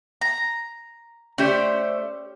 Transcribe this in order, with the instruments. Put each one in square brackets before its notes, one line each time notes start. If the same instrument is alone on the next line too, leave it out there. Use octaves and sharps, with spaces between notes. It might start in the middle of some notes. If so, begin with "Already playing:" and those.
[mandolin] A#5
[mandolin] A3 C5 [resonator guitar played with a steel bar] C#4 G4 D5